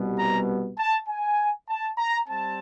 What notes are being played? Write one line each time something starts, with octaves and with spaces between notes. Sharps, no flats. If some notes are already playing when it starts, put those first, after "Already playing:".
Already playing: C2 B2 G3 B3
A#5
A5
G#5
A5
A#5
G3 C4 A5